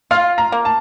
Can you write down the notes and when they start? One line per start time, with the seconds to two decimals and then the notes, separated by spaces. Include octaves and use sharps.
0.11 F4 F5
0.38 A#5
0.52 A#3
0.65 A5